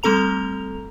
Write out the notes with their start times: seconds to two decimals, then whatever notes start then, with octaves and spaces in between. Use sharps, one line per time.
0.03 G3 A3 C4 A4 A#5 F7